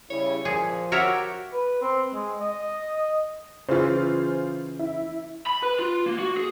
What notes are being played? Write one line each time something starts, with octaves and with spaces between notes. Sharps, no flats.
C#3 G3 E4 C#5
A#2 F3 G#4
F#4 G4 A#4 C#5 E5
B4
C4
G#3
D#5
C#3 E3 F4 G#4 C5
E4
B5
B4
F4
A#3
F#4
G#4